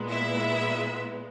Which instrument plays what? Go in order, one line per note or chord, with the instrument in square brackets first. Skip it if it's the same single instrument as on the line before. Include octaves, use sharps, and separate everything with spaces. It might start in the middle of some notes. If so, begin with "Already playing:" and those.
Already playing: [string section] A#2 G#3 B3
E4 E5